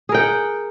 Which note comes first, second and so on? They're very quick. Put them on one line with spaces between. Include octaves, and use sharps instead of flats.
G#4 A#4 G5 F#5